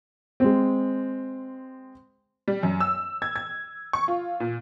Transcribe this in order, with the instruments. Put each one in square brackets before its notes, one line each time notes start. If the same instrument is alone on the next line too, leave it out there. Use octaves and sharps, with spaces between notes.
[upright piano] G#3 C4
[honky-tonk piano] G3
F#2
E6
G#6
G#6
C#6
F4
A#2